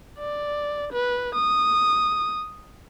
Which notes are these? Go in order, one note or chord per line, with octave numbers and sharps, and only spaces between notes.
D5
B4
D#6